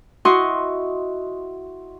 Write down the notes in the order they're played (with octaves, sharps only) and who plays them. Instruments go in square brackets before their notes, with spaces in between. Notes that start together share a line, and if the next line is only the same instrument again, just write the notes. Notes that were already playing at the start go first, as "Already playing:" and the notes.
[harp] E4 F#4 D#5 C6 C#6